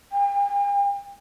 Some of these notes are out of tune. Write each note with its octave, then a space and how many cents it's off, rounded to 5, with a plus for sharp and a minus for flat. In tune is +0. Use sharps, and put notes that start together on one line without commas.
G5 +45